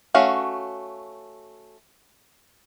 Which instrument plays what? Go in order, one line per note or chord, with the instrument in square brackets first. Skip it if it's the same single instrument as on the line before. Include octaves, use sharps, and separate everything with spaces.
[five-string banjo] A3 C#4 F#4 F5